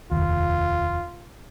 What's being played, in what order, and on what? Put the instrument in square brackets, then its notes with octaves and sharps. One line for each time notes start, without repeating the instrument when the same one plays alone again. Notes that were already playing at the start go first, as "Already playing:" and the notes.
[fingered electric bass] F1 D#2 [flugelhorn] F4